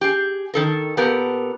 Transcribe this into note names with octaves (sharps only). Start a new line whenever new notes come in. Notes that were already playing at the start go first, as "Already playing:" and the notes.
G4 G#4
D#3 A4 A#4
A#2 B3 G4 A4 A#4